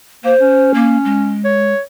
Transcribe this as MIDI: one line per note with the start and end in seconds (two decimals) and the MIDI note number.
0.24 0.34 58
0.24 0.71 72
0.39 1.38 61
0.74 0.97 58
1.04 1.73 56
1.44 1.80 73